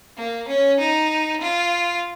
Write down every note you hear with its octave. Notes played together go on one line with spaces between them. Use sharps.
A#3
C#4
D#4
F4